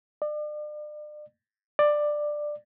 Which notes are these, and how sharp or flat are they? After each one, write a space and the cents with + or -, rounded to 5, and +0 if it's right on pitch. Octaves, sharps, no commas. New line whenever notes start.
D5 +40
D5 +15